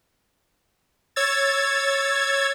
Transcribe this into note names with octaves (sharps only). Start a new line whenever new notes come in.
C#5 E6 G#6 A6